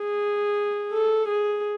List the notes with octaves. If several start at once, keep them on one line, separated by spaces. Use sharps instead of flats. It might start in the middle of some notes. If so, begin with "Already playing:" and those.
Already playing: G#4
A4
G#4